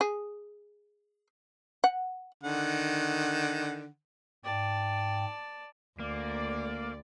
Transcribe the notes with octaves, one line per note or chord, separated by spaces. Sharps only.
G#4
F#5
D3 D#3 F#5
G#2 D5 G5 A5
D2 A#3 D5